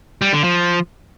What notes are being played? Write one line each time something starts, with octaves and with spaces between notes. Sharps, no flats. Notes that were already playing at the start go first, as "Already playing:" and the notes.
G3
D3
F3